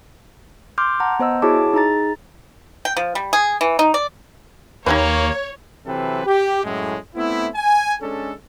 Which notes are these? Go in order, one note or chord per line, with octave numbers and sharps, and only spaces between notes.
C6 D6 F6 G6
F#5 A5 A#5
B3 C5 D#5 E6
E4 F#4 G#4 C#5 A5 D6
D#4 G#4 A#5 A6
G5
F3
G3
G#4
E3
D#4
D5
D#2 A#3 D#4 G4 B4 C#5
C3 E3 F#3 C4 A4 B4
G4
F#2 A2 G#3
A3 B3 C4 E4
G#5
G#3 C#4 D4 A4